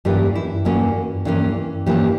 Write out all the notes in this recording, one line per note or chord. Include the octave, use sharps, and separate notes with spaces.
G2 E3 A#3 C#4 G4
E4
G2 E3 A#3 C#4 F#4
G2 E3 A#3 C#4
G2 E3 A#3 C#4 G4